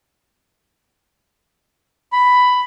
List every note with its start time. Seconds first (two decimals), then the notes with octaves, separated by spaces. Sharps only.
2.13 B5